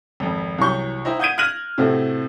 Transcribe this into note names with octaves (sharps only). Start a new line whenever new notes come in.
G#1 F2
C2 E3 F#3 C#6 G6
D#4 E4 C5 G5
F#5 D#6 G6 G#6 D7 D#7
F6 F#6 G#6 A#6 D#7 F#7
A2 C3 A3 C4 F#4